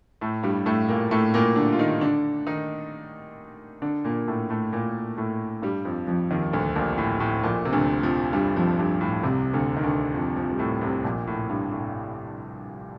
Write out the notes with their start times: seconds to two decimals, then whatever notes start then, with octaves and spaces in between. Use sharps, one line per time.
0.21 A2 A3
0.43 G2 G3
0.66 A2 A3
0.89 A#2 A#3
1.11 A2 A3
1.34 A#2 A#3
1.56 D3 D4
1.73 F4
1.79 D#3 D#4
2.01 D3 D4
2.47 D#3 D#4
3.82 D3 D4
4.04 A#2 A#3
4.28 A2 A3
4.50 A2 A3
4.72 A#2 A#3
5.17 A2 A3
5.62 G2 G3
5.85 F2 F3
6.07 F2 F3
6.30 D#2 D#3
6.53 D2 D3
6.75 A#1 A#2
6.98 A2
7.20 A2
7.43 A#1 A#2
7.65 C3
7.73 D2 D3
8.03 F2 F3
8.33 G2 G3
8.56 F2 F3
8.79 G2
9.01 A2
9.23 C2 C3
9.54 D2 D3
9.77 D#3
9.83 D2 D3
10.14 F2 F3
10.37 F2 F3
10.51 G3
10.59 A2 A3
10.81 C2 C3
11.04 A#1 A#2
11.27 A2
11.50 G2
11.72 A2